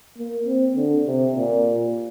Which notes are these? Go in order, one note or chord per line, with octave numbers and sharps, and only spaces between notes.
A#3
C4
D3
C3
A#2